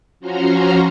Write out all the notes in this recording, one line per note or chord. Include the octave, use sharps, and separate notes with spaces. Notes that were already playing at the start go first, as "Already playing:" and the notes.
F3 C#4 F#4 A#5 C6 F6